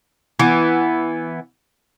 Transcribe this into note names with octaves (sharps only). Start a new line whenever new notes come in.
E3 B3